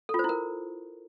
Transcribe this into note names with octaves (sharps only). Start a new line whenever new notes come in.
A4
F4
C5
E4
A#4